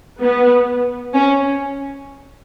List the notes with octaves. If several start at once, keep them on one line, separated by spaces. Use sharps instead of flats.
B3
C#4